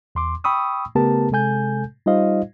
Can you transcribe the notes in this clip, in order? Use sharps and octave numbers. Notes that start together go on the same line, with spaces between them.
E2 C6 D6
G5 B5 C#6 D#6 E6
C#3 A3 B3 G4 A#4 A5
C3 G#3 A4 G#5 G6
G3 D#4 F4 C5 D#5 F5